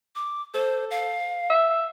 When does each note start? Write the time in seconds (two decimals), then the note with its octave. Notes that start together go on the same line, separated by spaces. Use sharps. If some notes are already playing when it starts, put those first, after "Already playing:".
0.15 D6
0.54 A4 C5
0.91 F5
1.50 E5